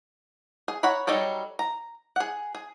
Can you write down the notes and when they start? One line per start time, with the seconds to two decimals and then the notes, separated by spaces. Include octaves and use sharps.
0.68 G#4
0.83 C#5 F#5 A#5 B5
1.07 F#3 G3 D#4 A4 C#5
1.59 A#5
2.16 G#4 F#5
2.55 G#4